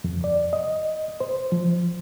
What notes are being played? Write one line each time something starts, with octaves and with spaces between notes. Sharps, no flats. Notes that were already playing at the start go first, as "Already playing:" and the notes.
F2
D5
D#5
C5
F3